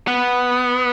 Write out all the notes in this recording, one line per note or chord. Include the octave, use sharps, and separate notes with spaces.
B3